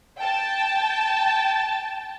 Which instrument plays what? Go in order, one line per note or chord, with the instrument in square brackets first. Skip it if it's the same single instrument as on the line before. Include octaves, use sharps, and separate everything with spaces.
[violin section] G5 A5